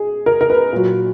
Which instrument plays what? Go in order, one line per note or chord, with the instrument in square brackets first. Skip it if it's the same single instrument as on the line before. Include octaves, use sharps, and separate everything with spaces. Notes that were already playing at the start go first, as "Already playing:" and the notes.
Already playing: [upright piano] G#4
A#4
A#4
B4
A#2 F#3